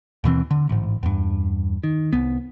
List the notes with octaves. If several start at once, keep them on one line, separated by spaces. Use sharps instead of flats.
D#2 B2 E3 C4
D3
A1 G#2
E2 G2
D#3
C2 B3